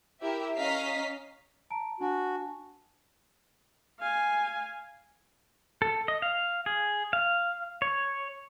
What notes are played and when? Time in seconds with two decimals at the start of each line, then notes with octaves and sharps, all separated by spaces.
0.21 E4 G4 A#4 E5
0.56 C#4 D#5 F5 A#5 B6 C7
1.70 A5 A#5 D7
2.00 D4 F#4 G#5 A5
4.00 F5 G#5
5.82 A4
6.08 D#5
6.22 F5
6.66 G#4
7.13 F5
7.82 C#5